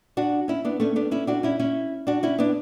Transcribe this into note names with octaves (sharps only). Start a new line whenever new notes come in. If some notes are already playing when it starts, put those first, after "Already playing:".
D4 F#4
C#4 E4
B3 D4
A3 C#4
B3 D4
C#4 E4
D4 F#4
C#4 E4
C#4 E4
D4 F#4
C#4 E4
B3 D4